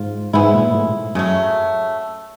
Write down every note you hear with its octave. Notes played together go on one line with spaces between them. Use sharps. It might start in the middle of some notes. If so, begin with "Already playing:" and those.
Already playing: G#2 F4
G#2 G#3 B3 E4
A#2
A2
G#2
F#2 C#3 F#3 A3